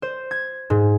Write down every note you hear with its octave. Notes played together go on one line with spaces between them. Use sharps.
C5
G#6
G#2